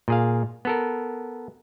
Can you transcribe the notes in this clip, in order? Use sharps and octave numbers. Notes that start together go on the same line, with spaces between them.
A#2 G#4 F5
B3 A4 A#4